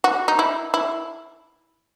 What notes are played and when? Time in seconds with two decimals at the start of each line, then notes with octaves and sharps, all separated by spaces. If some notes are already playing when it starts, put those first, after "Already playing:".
0.04 F#4
0.28 D#4
0.39 E4
0.74 E4